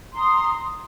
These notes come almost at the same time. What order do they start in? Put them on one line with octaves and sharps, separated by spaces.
C6 A#5 D#6